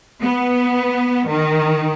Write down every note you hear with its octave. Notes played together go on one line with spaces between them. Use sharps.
B3
D#3